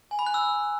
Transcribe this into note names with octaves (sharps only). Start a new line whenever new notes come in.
G#5
B5
F#6
E6